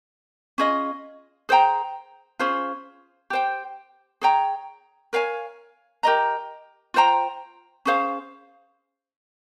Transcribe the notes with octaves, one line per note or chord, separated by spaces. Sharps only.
C#4 F4 G#4 D#5
G#4 C5 G5 A#5
C#4 F4 G#4 C5
G4 C5 G5
G#4 C#5 G5 A#5
A#4 C#5 F5 G#5
G4 A#4 D#5 A#5
F4 C5 G5 A#5
C#4 G#4 C5 F5